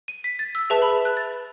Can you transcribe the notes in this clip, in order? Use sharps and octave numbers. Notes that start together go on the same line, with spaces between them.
D#7
B6
A6
E6
G#4 B4 E5 A5
B5
F#6
A6